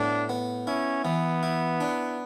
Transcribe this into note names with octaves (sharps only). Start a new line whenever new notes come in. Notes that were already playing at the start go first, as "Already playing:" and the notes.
Already playing: A2 B3 D4
B3
C#4 E4
E3 B3
E4
D4